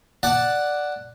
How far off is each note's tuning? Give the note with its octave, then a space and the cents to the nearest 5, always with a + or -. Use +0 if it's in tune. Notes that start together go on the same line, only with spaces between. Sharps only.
D5 +0 F#5 +0 A5 +0